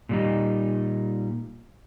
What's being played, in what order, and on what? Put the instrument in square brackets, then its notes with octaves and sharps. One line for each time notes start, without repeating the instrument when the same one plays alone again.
[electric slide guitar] A#2 G3 D#4